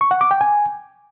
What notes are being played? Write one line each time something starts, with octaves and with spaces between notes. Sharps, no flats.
C#6
F#5
D6
G5
G#5